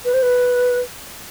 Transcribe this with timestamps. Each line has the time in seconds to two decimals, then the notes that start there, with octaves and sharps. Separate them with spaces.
0.04 B4
0.13 C5
0.22 B4